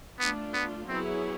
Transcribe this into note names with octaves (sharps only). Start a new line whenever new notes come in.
A3 B3 D4 F4
B3
F#3 B3 C4 E4 G#4 C#5